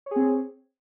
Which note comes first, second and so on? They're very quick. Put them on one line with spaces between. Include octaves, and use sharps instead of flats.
C#5 G#4 C4